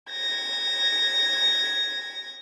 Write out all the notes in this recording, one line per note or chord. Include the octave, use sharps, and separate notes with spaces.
G#6 A#6